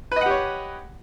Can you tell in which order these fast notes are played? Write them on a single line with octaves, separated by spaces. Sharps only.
B4 D#5 F#5 G4 C#5